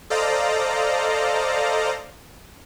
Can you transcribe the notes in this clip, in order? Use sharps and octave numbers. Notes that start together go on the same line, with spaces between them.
A4 C5 D5 D#5 F5 A#5